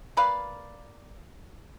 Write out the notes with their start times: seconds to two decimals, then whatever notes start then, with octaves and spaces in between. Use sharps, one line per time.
0.17 A#3 B4 D5 F5